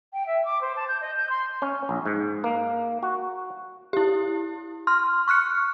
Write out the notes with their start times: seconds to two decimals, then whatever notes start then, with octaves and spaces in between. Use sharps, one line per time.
0.13 G5
0.27 E5
0.45 D6
0.61 C5
0.76 A5
0.88 G6
1.01 D#5
1.16 G6
1.30 C6
1.62 C#4
1.89 A#1
2.05 G#2
2.44 A#3
3.03 F#4
3.93 E4 G4
4.87 C6 F6
5.28 C#6 F6 F#6 C#7